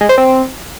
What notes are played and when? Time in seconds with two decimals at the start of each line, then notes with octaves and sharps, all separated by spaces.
0.01 G#3
0.09 C5
0.18 C4